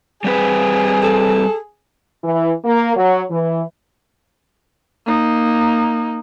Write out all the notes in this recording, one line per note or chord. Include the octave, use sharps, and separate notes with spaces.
G3 C4 G#4 B4
A4
E3
A#3
F#3
E3
A#3 D#4